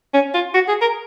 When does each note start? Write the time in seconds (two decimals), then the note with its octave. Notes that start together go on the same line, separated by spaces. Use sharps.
0.14 C#4
0.34 F4
0.54 F#4
0.68 G#4
0.81 A#4